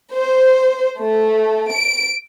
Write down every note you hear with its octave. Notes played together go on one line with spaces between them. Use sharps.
C5
A3
D7